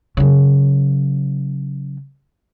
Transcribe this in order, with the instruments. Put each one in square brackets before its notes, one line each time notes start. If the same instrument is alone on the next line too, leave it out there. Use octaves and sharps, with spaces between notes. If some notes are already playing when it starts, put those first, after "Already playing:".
[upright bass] C#3 F#3